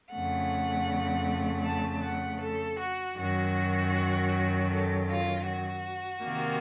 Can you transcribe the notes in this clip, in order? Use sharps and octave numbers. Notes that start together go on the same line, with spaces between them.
F2 C#3 A3 F#5
A5
F#5
A4
F#4
F#2 D#3 F#3 F#4
A4
F4
F#4
C3 D#3 A#3